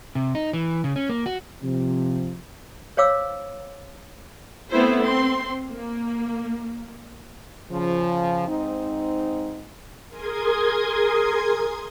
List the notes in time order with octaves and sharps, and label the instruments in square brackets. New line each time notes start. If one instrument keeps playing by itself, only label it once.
[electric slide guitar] C3
D#4
E3
C#3
C#4
A#3
F#4
[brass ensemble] C3 F3
[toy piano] C5 C#5 F5 D6 E6
[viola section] A3 B3 C4 E4 C5
C4 C6
A#3
[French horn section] C#3 F3
G#2 C4 D#4
[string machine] G#4 A#4 C6 D#6 G#6